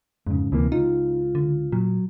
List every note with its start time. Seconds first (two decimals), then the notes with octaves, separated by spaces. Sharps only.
0.27 F2 G#2 C#3
0.52 D2 C3 E3 A#3
0.72 C#2 D#4 F4
1.35 D3
1.72 A#2 F#3